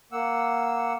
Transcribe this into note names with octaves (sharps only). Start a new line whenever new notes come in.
A#3 F#5 E6